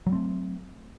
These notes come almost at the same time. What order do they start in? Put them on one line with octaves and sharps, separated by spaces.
F#3 G3 C4 A3